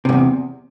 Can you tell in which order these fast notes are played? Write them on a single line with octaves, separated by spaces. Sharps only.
C3 G#2 E2